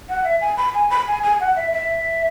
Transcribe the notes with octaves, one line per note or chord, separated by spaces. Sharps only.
F#5
E5
G#5
B5
G#5
B5
G#5
G#5
F#5
E5
E5